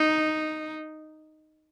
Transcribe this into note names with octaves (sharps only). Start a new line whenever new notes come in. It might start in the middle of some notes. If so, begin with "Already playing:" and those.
Already playing: D#4